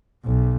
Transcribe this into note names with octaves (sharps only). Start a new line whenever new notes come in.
B1